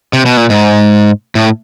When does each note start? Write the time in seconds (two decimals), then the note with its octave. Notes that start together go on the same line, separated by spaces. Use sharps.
0.13 C3
0.26 B2
0.37 A#2
0.50 G#2
1.35 A2